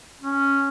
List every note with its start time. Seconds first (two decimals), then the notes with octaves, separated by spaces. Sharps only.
0.22 C#4